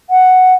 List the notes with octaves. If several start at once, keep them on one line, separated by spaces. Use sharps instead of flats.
F#5